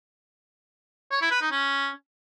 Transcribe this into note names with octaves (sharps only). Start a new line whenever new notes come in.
C#5
E4
B4
D#4
C#4